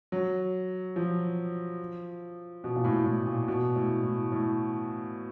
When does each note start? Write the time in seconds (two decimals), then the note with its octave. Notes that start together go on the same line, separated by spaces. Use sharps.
0.12 F#3
0.96 F3
2.64 B2
2.76 A#2
2.84 A2
3.06 A2
3.26 A#2
3.48 B2
3.76 A2
4.03 A2
4.32 A2